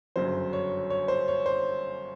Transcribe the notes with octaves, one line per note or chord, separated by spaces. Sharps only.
G1 F#2 C#3 F#3 C5
C#5
C#5
C5
C#5
C5